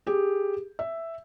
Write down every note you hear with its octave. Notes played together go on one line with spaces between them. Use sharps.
G4 G#4
E5